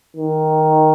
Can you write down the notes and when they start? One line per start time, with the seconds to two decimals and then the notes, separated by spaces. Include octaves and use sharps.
0.17 D#3